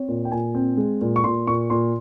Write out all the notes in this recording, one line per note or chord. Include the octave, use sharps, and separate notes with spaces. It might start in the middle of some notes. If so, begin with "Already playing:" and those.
Already playing: C4 C#5
A#2
G5
A#2 G#5
C4
G#3
A#2
C#6
A#2 C6
A#2 C#6
A#2 C6